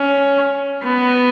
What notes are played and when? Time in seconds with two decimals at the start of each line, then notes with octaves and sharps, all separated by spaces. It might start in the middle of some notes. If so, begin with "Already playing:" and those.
Already playing: C#4
0.83 B3